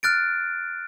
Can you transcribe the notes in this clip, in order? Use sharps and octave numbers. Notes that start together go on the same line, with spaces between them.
F6 F#6 A6 D7